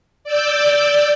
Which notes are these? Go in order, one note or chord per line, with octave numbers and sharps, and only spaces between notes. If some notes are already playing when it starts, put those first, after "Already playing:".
D5 D6 E6 G6